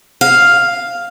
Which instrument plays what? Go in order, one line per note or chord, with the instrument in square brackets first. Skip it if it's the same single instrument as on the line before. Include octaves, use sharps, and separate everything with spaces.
[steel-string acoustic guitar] F5